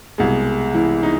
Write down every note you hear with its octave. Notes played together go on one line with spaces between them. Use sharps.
C2 B2 G#3
E3 E4
D#4